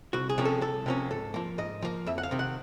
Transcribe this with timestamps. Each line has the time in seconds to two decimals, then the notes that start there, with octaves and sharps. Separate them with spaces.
0.13 C2 F#4
0.29 G#4
0.38 C3 F3 A#3 C#4
0.45 A4
0.61 C2 A4
0.86 C3 F3 A#3 C#4
1.11 G#2 A4
1.34 F3 A#3
1.58 G#2 D#5
1.82 F3 A#3
2.06 F2 E5
2.18 F#5
2.23 F5
2.31 C3 D#3
2.39 F#5